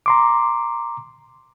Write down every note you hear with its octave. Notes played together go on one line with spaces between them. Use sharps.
A#5 C6 D6